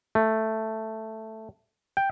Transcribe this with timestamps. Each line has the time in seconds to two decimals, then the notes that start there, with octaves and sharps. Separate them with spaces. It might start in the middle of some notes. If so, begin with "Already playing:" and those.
0.15 A3
1.97 G5